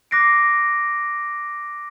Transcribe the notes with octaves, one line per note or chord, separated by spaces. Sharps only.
D6 F#6 A#6 C7 D7